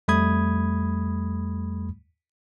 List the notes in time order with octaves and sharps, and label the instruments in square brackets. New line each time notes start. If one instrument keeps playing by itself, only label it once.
[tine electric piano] F2 G3 A3 B5 D#6 G#6